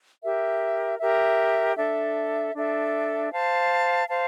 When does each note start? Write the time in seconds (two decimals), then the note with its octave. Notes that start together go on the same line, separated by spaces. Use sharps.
0.22 G4 A#4 E5
0.99 G4 A#4 E5
1.76 D4 A4 E5
2.54 D4 A4 E5
3.31 C5 F5 A5
4.07 C5 F5 A5